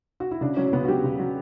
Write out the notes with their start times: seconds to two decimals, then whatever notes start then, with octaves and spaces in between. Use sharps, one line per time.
0.20 F#4
0.31 E4
0.41 C#3 D4
0.57 F#3 C#4
0.73 C#3 B3
0.84 F#4
0.88 F#3 G4
1.04 C#3
1.19 F#3